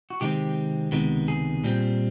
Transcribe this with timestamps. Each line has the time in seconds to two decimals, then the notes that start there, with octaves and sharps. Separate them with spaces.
0.10 F#4
0.21 C3 D#3 G#3 C4 G4
0.92 C#2 C3 D#3 G#3 B3
1.28 G#4
1.64 A#2 G3 C4